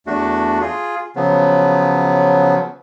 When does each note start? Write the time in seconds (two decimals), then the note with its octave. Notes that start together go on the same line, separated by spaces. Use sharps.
0.07 E2 A3 D4 F#4
0.61 F4 G#4
1.16 C#3 F3 F#3 B3